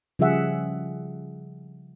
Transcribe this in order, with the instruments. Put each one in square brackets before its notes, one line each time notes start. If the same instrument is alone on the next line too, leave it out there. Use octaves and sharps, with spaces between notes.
[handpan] C#3 F3 G3 G#4 E5 F#5